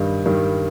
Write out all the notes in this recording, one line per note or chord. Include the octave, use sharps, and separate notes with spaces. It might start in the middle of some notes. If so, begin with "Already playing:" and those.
Already playing: G2 D#3 G3
G2 D#3 G3